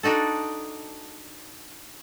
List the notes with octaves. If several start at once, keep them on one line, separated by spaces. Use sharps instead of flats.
D4 D#4 F#4 A4